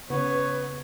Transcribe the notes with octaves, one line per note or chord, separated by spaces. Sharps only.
C#3 B3 B4 C#5